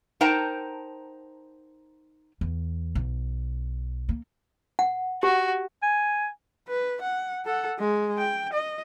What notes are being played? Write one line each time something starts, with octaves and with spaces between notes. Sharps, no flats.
D#4 A#4 C5 G5 A5 A#5
E2
B1
A#3
F#5
F#4 G4
G#5
B4
F#5
A4 F#5
G#3
G5
D#5